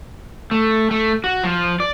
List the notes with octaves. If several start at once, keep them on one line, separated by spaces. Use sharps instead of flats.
A3
A3
F#4
F3
D5